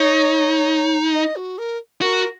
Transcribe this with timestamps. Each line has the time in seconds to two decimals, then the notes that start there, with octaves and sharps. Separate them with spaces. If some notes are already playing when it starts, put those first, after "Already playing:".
Already playing: D#4 C#5
1.14 D#5
1.36 F#4
1.58 A#4
2.01 F#4 A#4